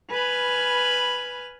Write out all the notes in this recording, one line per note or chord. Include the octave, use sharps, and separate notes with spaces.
B4 G#5 B5 F6